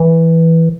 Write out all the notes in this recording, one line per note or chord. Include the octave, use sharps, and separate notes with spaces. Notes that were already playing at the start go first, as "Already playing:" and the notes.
Already playing: E3